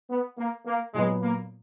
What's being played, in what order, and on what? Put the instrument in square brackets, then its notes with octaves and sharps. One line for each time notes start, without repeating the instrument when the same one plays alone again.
[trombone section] B3
A#3
A#3
[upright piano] A#2 F#3 B3 [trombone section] G#3
[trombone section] A#3